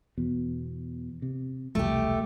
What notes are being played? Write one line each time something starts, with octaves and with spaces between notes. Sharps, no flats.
E2 B2
C3
E1 C2 A3 G4